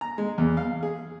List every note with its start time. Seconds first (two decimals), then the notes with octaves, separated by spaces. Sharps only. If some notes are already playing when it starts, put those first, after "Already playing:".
0.01 A#5
0.18 G#3
0.38 E2
0.57 F5
0.83 G#4